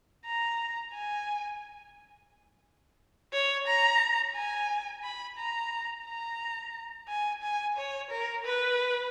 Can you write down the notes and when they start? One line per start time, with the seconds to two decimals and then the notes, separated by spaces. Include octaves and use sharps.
0.26 A#5
0.94 G#5
3.33 C#5
3.68 A#5
4.35 G#5
5.03 B5
5.38 A#5
6.06 A#5
7.09 G#5
7.43 G#5
7.77 C#5
8.11 A#4
8.45 B4